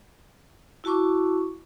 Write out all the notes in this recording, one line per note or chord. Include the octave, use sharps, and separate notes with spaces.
E4 F#4 A5 C#6 D6